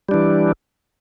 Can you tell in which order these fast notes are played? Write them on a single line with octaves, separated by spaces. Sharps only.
G3 D4 E3